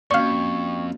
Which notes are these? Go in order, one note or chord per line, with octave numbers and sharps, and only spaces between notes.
F2 A#3 C#4 F#4 D5 F5 C#6